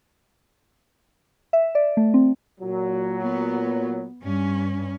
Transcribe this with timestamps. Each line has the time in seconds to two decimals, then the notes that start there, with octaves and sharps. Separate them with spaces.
1.53 E5
1.75 D5
1.97 A3
2.14 C4
2.61 A#2 F#3
3.22 B3
4.22 G2 C#4